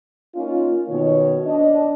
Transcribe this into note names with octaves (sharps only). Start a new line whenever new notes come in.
A#3 C#4 D#4 F4
B2 D#3 C#5
D4 D#5